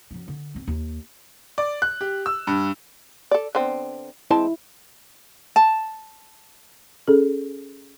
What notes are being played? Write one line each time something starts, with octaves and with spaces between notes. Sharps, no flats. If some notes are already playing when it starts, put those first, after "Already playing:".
F#2 F3
D3
F#2 C4
D#2
D5
F#6
G4
E6
G2
A4 D5
D3 B3 C4
G#3 C4 E4 A5
A5
C#4 G#4 A4